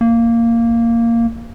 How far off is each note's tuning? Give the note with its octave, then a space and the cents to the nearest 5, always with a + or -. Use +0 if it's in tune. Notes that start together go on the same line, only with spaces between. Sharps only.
A#3 -10